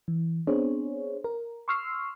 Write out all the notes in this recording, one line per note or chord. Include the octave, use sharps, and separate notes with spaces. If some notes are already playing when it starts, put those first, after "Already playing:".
E3
B3 C4 D4 G#4 C5 C#5
A#4
C6 C#6 E6 F6 C7